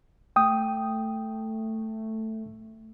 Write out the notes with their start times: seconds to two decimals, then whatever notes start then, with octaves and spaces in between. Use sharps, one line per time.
0.36 A3 G5 D#6